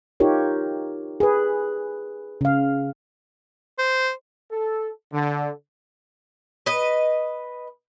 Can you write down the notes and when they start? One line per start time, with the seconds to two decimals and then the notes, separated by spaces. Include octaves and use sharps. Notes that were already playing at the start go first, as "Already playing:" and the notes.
0.20 D#4 F4 G4 A#4 C#5
1.20 G#4 B4
2.41 C#3 F5
3.79 C5
4.51 A4
5.13 D3
6.66 B4 D#5